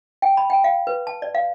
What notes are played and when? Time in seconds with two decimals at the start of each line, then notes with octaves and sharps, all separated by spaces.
0.22 G5
0.37 B5
0.50 G5
0.64 F5
0.87 B4
1.07 A5
1.22 D5
1.35 F5